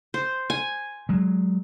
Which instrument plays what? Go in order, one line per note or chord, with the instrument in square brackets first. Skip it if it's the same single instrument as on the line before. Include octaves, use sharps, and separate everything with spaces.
[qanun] C5
G#5
[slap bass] F#3 G#3